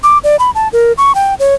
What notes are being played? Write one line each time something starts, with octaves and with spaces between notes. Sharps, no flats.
D6
D5
B5
A5
A#4
C#6
G5
C#5